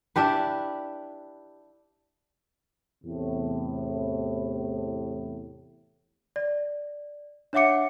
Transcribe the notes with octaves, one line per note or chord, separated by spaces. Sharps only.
D4 E4 G4 B4
E2 A2 C3
D5
D4 C#5 E5 F#5 D6 C#7